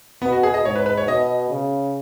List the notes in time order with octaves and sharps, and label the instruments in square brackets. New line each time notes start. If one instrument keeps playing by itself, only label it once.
[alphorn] B2 [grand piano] B3
[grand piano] F#4
G#4
D#5
[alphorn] G#2 [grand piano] C#5
[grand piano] B4
B4
C#5
[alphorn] B2 [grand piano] D#5
[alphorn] C#3